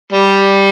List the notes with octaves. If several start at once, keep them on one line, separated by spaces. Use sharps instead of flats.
G3